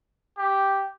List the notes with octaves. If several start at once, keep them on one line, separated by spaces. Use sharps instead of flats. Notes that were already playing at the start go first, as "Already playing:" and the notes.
G4